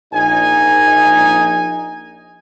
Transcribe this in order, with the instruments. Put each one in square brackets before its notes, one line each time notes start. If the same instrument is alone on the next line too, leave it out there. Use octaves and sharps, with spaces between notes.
[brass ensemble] A#1 D#4 G#5